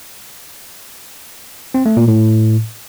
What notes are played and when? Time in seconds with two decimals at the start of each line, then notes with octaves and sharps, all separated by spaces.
1.74 C4
1.86 A3
1.97 A#2
2.08 A2